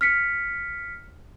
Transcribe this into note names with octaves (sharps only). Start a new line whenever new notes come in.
F6 B6 C#7